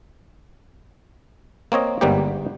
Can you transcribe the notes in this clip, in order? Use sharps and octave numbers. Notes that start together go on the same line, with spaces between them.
A#3 C4 C#5 D#5
G1 G#2 G3 A#3 B3 G4